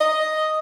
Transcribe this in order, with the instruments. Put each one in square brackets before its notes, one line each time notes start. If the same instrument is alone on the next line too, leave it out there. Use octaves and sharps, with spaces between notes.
[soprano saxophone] D#5